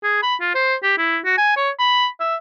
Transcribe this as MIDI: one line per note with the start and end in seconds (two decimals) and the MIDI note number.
0.03 0.20 68
0.22 0.35 83
0.40 0.50 65
0.55 0.75 72
0.83 0.94 67
0.98 1.19 64
1.25 1.34 66
1.38 1.55 80
1.56 1.70 73
1.79 2.07 83
2.20 2.36 76